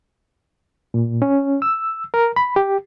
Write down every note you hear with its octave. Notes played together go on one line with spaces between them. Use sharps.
A#2
C#4
E6
A#4
B5
G4